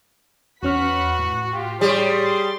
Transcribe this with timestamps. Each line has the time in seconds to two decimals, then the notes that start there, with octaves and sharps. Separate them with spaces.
0.63 E2 C#4 F#4 B4 F#5 F6 B6
1.19 A2
1.53 F4 G4
1.81 G3 G#4 C#5 C6
2.21 C6 A6